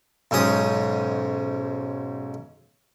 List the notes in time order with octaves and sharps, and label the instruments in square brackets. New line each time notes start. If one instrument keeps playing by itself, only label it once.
[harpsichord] B1 G#2 C#4 D#6